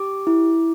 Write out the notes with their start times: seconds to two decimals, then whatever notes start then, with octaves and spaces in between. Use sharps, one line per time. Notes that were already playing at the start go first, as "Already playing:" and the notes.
Already playing: G4 D6
0.27 E4